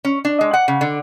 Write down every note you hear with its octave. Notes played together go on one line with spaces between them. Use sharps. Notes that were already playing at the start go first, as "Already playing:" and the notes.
C#4
D4
G#3
F#5
C#3
D3